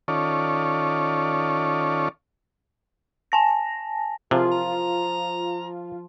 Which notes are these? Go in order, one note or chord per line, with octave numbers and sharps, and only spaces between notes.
D#3 C#4 F4 A4 C#5 D5
G#5 A5 A#6
C3 F3 F4 G#4
A#5